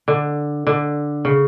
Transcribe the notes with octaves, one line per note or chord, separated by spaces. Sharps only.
D3
D3
C#3